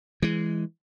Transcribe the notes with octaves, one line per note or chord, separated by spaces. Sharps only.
E3 G#3